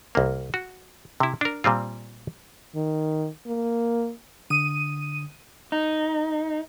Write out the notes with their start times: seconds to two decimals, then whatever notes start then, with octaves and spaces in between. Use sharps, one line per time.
0.15 C2 A#3
0.54 F#4
1.20 C3 E4
1.41 D4 A#4
1.64 A#2 G3 C4 F4
2.76 D#3
3.47 A#3
4.50 D3 D#6 D#7
5.72 D#4